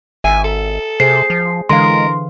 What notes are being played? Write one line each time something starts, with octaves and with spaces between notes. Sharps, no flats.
G#1 E5 G#5
A4
C3 G#4 C5 C7
F3
D3 E3 G#3 A#4 F5 C6